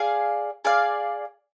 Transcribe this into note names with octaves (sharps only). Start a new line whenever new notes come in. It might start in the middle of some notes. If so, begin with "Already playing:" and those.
Already playing: G#4 D5 F5
G#4 D5 F5